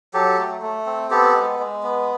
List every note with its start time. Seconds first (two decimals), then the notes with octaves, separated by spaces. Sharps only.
0.14 F#3 G4 A4
0.38 A3
0.62 A3
0.86 C4
1.11 B3 G4 A4
1.34 G#3
1.59 G#3
1.83 B3